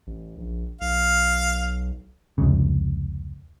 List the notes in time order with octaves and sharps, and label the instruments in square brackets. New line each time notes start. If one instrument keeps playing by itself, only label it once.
[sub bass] A1
A#1
[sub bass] B1 [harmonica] F5
[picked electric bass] F1 C#2 C#3